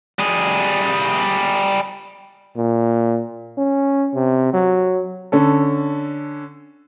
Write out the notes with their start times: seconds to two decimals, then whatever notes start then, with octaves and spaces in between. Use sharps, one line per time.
0.19 G3 G#4
2.57 A#2
3.58 C#4
4.15 C3
4.53 F#3
5.32 D3 C#4 A4